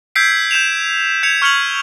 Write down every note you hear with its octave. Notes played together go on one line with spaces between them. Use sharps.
E6 G6 G#6 B6 C7 D7
G6 C7 E7 F7
G6 G#6 C#7 F7
C#6 F6 G#6 C#7 F7 F#7